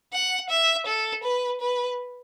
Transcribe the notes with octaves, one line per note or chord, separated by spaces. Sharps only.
F#5
E5
A4
B4
B4